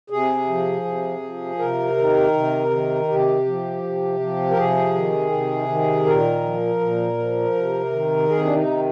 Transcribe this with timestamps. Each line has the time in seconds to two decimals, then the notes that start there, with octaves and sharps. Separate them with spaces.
0.10 C3 G#4
0.48 F3
0.85 C3
1.23 F3
1.59 C3 A#4
1.97 D#3
2.33 C3
2.71 D#3
3.08 C3 G4
3.46 F3
3.83 C3
4.20 F3
4.51 A#4
4.57 C3 G#4
4.94 D#3
5.32 C3
5.68 D#3
6.06 A#2 A#4
6.43 F3
6.81 A#2
7.18 F3
7.55 C3
7.92 D#3
8.29 C3 G#4
8.45 D4
8.55 D#4
8.67 D#3